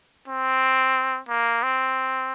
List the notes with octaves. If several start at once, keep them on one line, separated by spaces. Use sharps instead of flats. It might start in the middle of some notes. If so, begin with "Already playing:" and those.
C4
A#3
C4